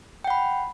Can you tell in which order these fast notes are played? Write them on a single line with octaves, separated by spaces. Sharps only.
G5 F#5 B5